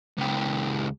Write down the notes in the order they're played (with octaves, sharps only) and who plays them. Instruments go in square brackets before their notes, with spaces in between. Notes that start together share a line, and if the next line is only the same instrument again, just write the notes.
[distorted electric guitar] C#2 G4